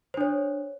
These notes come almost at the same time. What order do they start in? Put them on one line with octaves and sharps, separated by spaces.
C5 D4 C#5